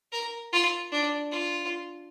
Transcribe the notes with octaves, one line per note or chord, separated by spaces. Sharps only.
A#4
F4
D4
F4